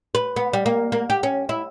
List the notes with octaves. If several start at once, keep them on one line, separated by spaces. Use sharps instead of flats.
B4
B3
G3
A#3
A#3
G4
C#4
E4